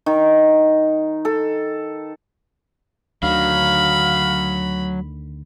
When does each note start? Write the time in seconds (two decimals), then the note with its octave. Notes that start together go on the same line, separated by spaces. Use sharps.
0.06 D#3
1.25 A4
3.23 D2 D3 D#3 F#3 F5 B5